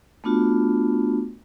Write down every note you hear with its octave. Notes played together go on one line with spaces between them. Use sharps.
A3 B3 D4 F4 F#4